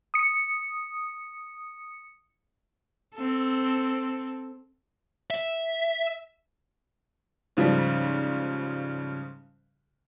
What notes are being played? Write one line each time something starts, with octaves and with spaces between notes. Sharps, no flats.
D#6 C#7
C4 A4
E5
G#2 C#3 F3 G3